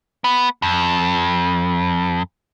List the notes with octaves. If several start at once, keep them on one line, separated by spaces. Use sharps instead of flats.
B3
F2